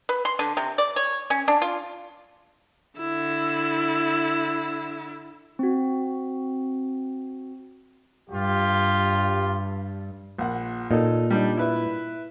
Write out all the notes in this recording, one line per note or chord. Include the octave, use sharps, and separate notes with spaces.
B4
C6
D3
C3
D5
C#5
C#4
D4
F4
D3 E4
C4 F#4
G2 F4 G4
A#1 F#5
A#2 D#4 A4
G3 D4 D#4
E4 B4 E5